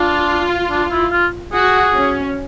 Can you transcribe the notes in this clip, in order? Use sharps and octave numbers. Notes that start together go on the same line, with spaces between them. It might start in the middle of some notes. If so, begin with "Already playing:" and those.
Already playing: D4 F4
D4
E4
F4
F#4 G#4
C#4